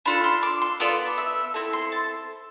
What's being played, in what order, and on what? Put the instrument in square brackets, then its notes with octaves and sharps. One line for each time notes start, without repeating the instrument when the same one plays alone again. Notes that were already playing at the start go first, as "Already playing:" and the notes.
[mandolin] D4 F4 A4 B5
C6
D6
C6
B3 F4 A4 D5
E5
C4 E4 A4
C6
A5